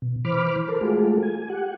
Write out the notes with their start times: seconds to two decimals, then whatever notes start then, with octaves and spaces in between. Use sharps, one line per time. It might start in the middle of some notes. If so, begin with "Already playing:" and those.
0.02 B2
0.25 E3 C5 B5 D6 F6
0.68 A4 A#4 C5
0.81 G#3 A3 F4 F#4 G#4 A4
1.23 G#5
1.50 G4 F#5